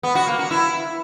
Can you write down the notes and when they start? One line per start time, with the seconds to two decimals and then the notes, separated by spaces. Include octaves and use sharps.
0.03 B3
0.15 F#4
0.27 A#3
0.39 F#4
0.51 E4